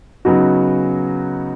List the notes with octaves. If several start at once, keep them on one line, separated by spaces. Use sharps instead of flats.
C#3 F#3 B3 D#4 F#4